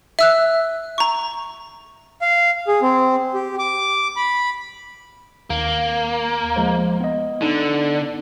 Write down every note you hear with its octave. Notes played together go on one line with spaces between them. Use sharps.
E5 E6 F#6
A#5 C#6
F5
G#4
C4
G4
D6
B5
D#2 A#3
F3 G#3 C5
B3 D#5
D3 B3 D#4